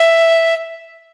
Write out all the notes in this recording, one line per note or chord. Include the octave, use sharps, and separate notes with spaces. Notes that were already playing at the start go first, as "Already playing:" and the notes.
Already playing: E5